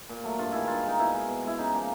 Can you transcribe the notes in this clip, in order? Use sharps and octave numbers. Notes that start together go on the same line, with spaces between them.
A#2
F#3 A3
G2 F4
D#3 G#3 E4
G2 F4
D#3 G#3 D#4
B2 E4
G#3
B2
G#3 E4
C#3 D#4
F3 A#3